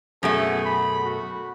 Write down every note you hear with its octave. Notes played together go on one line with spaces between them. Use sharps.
F#2 B2 A3 G#4
B5
F#4